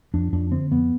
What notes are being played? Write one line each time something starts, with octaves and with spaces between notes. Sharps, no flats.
F2 D4
F2 D4
D3 C4
F2 B3